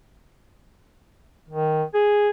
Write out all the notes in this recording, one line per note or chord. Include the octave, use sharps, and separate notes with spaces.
D#3
G#4